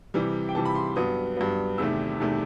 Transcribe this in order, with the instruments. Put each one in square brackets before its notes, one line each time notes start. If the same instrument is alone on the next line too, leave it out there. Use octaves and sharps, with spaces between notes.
[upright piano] C3 E3 G3
G5
C3 E3 G3 A5
B5
C6
G2 F#3 B3 D#6
G2 F#3 B3
E2 C3 D#3 A3 E6
E2 C3 D#3 A3